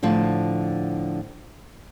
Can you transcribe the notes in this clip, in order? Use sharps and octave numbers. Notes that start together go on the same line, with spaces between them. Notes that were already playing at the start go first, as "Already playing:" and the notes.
A2 D3 F3 A5